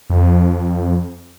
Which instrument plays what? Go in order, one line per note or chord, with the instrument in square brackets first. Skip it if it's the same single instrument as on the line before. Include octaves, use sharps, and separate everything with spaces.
[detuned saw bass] F2